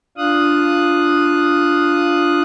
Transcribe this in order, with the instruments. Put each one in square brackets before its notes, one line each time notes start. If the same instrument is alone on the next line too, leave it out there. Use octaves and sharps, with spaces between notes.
[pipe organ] D4 F4 F5 D#6 F#6